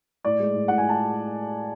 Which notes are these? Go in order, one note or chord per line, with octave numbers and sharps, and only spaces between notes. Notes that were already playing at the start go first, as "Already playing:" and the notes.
A2 D5
G#3
A2
A2 F#5
G#5
A2
A5